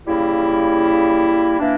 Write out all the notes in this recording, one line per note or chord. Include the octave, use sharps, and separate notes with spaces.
C#3 G3 A#3 E4
E3 A#3 D4